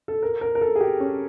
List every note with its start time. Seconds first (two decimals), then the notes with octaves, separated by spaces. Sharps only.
0.08 A4
0.23 A#4
0.41 A#4
0.55 A#4
0.61 A4
0.76 G#4
0.81 G4
1.00 C#4